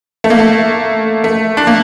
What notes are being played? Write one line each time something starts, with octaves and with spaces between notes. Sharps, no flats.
A3
A#3
A3
A3
D4
A#3